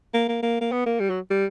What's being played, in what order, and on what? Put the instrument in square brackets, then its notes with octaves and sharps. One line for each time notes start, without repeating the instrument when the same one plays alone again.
[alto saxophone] A#3
A#3
A#3
A#3
B3
A#3
G3
F#3
G3